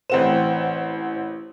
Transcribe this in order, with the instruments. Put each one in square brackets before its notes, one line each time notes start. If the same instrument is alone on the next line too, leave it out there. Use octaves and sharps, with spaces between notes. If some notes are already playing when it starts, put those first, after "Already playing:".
[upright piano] A1 C4 E7 [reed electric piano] C5 F#5